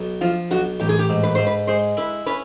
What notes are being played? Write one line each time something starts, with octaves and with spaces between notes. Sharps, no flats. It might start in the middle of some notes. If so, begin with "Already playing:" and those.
Already playing: B1
F3 F4
B1 F#4
A1 G4
G#4
G4
G#2
B4
G#2 C5
B4
G#3 C5
E4 B4
C#4 B4